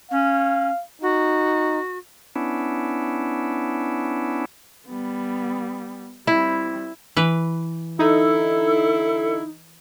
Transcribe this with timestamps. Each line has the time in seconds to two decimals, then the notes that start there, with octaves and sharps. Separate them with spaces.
0.11 C#4 F5
1.02 D#4 F#4
2.36 B3 C#4 D4 E4
4.88 G3 B3
6.27 G3 C4 E4
7.16 E3 B4
7.99 D3 D#4 E4 A4